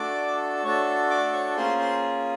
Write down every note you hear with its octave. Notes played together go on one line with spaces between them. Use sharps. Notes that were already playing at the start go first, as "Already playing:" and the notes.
Already playing: A3 D4 F#4 A4 D5 D6
A3 D4 F#4 A4 C#5 C#6
D5 D6
C#5 C#6
A#3 C#4 F4 G#4 C5 C6
C5 C6